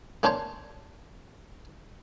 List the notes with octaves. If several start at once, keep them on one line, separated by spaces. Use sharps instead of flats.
A#3 C#4 D4 C5 C#5